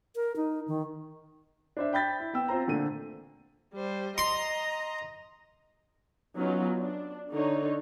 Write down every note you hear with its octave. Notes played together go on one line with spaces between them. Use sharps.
A#4
D#4
D#3
D4 C5 E5
G5 B5 G6 A6 B6
E4
B3 G5 E6
C4 F4 C5 A#5
A#2 D3 A3 D#7
G3 C5
D#5 A#5 C6
F#3 B3 C#4 D#4 F4
D4
D3 D#4 C#5